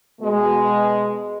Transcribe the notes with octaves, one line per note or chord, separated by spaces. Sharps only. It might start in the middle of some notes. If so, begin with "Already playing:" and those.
B2 G#3